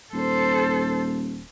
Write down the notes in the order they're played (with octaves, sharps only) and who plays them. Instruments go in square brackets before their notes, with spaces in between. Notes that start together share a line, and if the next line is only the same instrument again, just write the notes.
[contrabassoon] D#1 [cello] A4 C5